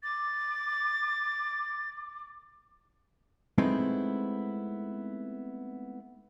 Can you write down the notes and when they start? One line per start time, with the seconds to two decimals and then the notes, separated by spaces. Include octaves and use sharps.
0.03 D6 A6
3.58 G#3 A3 B3 C4 D#4 E4